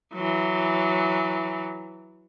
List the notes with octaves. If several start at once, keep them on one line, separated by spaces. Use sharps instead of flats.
E3 F#3